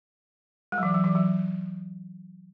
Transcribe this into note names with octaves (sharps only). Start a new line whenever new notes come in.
G#3
F#3
E3
F#3
E3
F#3